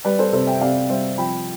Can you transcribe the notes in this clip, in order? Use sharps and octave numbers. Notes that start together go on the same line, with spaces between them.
G3 B4 D5
A4 C5
C3 A4 C5
E5 G5
C3 D5 F5
G3 C5 E5
F3 G5 B5